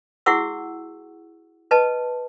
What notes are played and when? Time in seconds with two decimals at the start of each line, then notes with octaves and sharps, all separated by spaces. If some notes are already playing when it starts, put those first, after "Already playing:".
0.26 E4 F#4 G#4 F#5 C#6 E6
1.71 B4 D#5 A5